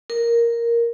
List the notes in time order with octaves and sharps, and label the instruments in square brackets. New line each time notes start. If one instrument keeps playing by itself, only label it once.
[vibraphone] A#4